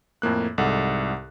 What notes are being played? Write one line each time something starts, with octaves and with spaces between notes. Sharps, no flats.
F2 A2 A#3 F#6
C2 G#2 A4 F#5